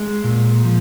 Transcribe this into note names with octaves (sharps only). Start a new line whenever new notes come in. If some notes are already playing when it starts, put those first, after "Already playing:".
Already playing: G#3
A#2
F3